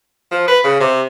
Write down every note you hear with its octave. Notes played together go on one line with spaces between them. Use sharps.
F3
B4
C#3
C3